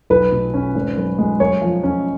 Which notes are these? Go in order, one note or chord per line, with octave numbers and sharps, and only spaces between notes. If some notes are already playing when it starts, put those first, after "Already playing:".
B1 B4
B2
C#4
G#1
F#2
G#3
F#2 C#5
F3
C#4